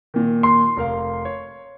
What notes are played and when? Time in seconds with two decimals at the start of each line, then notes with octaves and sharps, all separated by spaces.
0.14 A#2 D#3
0.43 C6
0.77 F1 A#4 F5
1.25 C#5